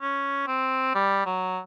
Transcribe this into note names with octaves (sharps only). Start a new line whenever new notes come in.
C#4
C4
G3
F#3